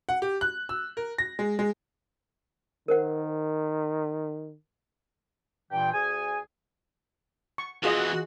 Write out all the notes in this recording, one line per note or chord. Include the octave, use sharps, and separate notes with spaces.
F#5
G4
F#6
E6
A#4
A#6
G#3
G#3
D#3 A#4 C5 F#5
G2 A#2 E3 G5
D2 G#4 G#5
C#6
B2 E3 F4 F#4 G#4 D#5